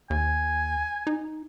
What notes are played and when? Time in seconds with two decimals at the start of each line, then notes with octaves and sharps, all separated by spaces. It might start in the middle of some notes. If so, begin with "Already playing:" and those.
0.10 D#2 G#5
1.07 D#4